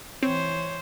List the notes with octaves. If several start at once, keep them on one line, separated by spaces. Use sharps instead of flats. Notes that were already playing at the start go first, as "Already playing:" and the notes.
E3 C4 C5 C#5